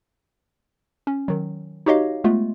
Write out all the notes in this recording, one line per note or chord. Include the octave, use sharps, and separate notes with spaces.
C#4
D#3 F#3
D#4 F#4 G4 C#5 D#5 F5
G#3 A3 B3 F4